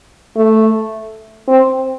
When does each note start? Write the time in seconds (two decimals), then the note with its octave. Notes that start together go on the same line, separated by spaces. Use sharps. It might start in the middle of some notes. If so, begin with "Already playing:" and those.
0.36 A3
1.48 C4